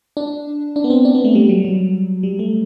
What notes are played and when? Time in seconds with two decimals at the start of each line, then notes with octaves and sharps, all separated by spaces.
0.17 D4
0.76 D4
0.84 B3
0.90 C4
1.05 D4
1.15 B3
1.25 A3
1.35 G3
1.49 F#3
1.65 F#3
2.23 G3
2.39 A3